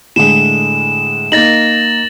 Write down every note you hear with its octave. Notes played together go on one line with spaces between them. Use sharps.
A2 D3 G#3 E7
A#3 D#4 A6 A#6 F#7